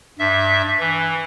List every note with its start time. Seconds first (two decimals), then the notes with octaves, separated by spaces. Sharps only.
0.19 G2 E5
0.80 E3